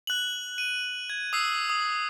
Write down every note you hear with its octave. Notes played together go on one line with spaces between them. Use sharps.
F#6 F#7
D#7
G#6
D#6 E6 C7
D#6